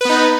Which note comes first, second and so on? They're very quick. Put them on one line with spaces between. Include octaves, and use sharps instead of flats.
B4 B3 D#4